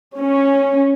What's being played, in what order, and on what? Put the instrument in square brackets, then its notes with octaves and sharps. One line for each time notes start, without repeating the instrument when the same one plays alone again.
[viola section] C#4